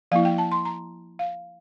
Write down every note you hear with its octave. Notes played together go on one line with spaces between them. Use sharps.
F3 A#3 E4 F5
G5
A5
C6
A#5
F5